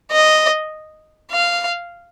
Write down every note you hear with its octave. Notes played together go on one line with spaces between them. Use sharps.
D#5
F5